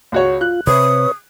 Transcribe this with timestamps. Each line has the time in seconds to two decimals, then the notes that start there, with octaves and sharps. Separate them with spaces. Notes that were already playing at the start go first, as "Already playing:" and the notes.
0.12 C#2 F#4 C#5
0.41 F4 F#6
0.67 C3 B4 C#5 D#6